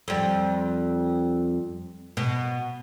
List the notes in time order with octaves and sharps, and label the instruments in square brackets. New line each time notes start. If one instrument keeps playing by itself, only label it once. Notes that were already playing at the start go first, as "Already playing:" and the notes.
[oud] F2 G3
B2